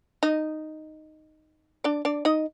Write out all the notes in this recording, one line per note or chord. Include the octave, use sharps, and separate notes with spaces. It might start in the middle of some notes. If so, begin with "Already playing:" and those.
D#4 D#5
D4 D5
D4 D5
D#4 D#5